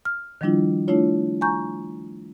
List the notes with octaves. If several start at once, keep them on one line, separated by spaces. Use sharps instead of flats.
F6
D#3 F3 G3 D4 E4 F4
A3 D4 E4 F4 C#5
G#5 A#5 C#6 G6